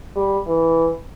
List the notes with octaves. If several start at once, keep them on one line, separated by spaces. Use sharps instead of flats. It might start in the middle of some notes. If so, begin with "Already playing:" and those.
G3
E3